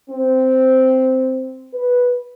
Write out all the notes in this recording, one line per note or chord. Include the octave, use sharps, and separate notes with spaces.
C4
B4